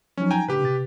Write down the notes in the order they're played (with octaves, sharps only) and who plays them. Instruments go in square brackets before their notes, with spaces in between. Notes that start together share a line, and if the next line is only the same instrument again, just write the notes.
[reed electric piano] F3 F#3 D#4 [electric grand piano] C#4
[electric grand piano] G5 G#5 A#5
[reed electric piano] A2 C#3 D4 [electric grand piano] G4 B4
[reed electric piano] C3 A6